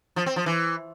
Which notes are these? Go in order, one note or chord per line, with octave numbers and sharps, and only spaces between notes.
F3
C4
F3
E3